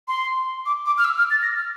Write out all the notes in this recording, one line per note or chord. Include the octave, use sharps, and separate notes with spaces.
C6
D6
D6
F6
E6
F6
A6
A#6
F6